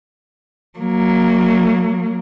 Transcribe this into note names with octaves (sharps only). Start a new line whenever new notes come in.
F#3 A#3